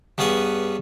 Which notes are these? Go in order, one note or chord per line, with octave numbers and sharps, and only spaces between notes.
G2 B3 C#4 G#4 F#5 G#5